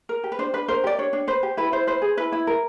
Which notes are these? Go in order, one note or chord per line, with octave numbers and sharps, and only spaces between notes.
A#4
G4
B4
D4 C5
D4 B4
A#4 C5
G4 D5
D4 C#5
D4
B4 C5
G4
E4 B4
E4 C5
B4 C5
G#4
E4 B4
E4
A#4